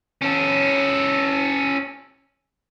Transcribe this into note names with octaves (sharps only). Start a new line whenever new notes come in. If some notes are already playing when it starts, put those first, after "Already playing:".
C#4 A4